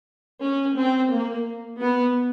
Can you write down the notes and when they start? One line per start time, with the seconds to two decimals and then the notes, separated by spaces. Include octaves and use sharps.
0.41 C#4
0.76 C4
1.11 A#3
1.80 B3